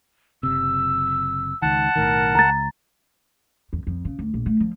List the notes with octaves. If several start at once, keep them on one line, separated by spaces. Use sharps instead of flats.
F#1 C3 E6
C#2 D#3 F#5 A5
B1 A2 D#3 A#4
C#2 A#5 A6
E2
F2
C#3
D2
A#1
A3
F3